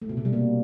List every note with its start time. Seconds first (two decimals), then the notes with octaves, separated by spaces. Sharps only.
0.02 A3
0.09 B2
0.17 C3
0.25 G3
0.33 A#3